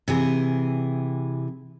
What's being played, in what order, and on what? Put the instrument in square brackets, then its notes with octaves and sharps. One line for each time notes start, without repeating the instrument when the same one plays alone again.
[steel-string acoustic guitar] C3 E3 G#4